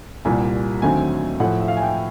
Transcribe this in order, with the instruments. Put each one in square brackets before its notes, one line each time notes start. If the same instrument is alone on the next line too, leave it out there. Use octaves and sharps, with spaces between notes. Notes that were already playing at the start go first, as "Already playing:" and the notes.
[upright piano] C2 A#2 G3 G#5
D#2 D3 F#3 A3 C4 G#5
A2 F3 A3 F#5
E5
F5
G#5
G5